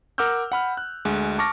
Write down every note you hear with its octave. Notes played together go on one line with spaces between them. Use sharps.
A#4 F#5 D6 E6 F6 G6
F#5 B5 F6
F#6
D2 G#3
A5 C#6 D6 F6 A#6